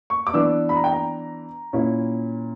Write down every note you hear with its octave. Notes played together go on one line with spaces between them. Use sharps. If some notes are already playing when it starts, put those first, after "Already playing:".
C#6
D6
E3 B3 D4 E6
B5
A#5
G5
A#5
A#2 A#3 C#4 E4